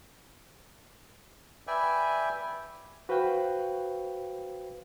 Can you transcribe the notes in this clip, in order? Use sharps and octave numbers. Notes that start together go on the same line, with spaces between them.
B4 D5 E5 G5 G#5
F#4 B4 C5 F5 G5